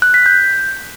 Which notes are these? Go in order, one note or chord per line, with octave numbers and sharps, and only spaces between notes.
F#6
B6
G6